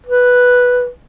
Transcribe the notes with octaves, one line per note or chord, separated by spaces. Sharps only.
B4